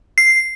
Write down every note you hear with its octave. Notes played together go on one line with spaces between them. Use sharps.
C7